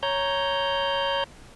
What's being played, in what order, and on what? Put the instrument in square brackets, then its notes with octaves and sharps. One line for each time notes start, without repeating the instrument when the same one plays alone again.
[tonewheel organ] C#5 A#5 G6